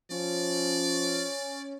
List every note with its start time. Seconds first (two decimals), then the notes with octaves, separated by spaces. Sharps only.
0.11 F3 C#4 D5